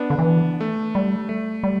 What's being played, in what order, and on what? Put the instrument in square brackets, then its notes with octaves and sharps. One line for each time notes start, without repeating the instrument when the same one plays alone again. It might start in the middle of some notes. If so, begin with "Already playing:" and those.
Already playing: [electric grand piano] B3 D4
[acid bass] D3
E3
[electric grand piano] A3
[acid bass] G3
[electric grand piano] A3
[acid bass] G3